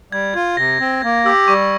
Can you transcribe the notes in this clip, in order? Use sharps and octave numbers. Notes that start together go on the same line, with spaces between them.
G3 G#6
F4 G#6
C3 A#6
C4
A#3 G#6
G4 E6
G3 C#6